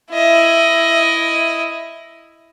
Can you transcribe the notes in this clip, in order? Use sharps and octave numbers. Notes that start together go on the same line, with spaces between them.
E4 D#5